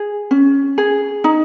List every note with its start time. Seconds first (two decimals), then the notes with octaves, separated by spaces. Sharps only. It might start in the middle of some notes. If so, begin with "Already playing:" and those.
Already playing: G#4
0.31 C#4
0.78 G#4
1.24 D#4